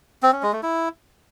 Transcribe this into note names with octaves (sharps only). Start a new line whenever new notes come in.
C4
C#4
G#3
A3
E4